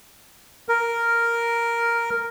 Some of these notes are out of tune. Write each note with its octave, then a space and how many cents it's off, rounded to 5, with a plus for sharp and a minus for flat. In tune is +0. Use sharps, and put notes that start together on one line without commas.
A#4 +0